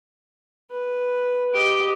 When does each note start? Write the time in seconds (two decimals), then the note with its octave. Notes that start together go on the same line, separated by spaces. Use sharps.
0.71 B4
1.54 G4 D#5 D7